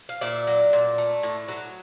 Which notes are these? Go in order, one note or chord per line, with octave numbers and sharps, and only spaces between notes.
F5
A#2 D5 E5
F#3
A#2
A3
A2
F#3